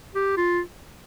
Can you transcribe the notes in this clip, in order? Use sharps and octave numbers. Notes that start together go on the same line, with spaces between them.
G4
F4